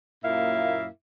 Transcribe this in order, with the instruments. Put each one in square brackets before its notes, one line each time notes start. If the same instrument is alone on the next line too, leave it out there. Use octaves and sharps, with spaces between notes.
[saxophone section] F#2 A#2 A#3 E4 E5 F5